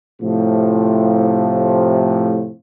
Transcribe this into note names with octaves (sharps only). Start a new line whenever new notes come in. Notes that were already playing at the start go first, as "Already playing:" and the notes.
A2 C3 F3